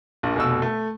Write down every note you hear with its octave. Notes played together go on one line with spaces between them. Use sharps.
A#1 A#2
F1 B2 E6
A3